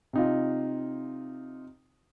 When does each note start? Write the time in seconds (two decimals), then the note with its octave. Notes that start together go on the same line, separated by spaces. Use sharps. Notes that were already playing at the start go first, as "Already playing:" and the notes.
0.13 C3 D#4 F4